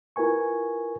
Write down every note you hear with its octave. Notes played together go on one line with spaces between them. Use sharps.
E4 F4 A#4 B4 G#5 C#6